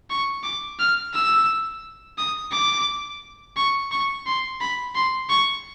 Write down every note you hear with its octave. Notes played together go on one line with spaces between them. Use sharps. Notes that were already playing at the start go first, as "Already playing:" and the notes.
C#6
D6
F6
E6
D#6
D6
C#6
C#6
C6
B5
C6
C#6